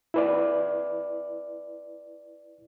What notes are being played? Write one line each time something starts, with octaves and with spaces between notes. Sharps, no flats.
E4 B4 D5